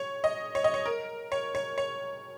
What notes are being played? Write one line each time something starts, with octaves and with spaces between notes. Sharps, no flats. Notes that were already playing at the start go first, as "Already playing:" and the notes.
Already playing: C#5
D#5
C#5
D#5
C#5
A#4
C#5
C#5
C#5